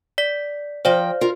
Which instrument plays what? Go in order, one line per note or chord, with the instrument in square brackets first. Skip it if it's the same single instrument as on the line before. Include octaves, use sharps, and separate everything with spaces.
[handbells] D5 B6
[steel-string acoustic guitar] F3 G5 [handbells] C5 D5 F5
[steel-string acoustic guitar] F4 A#4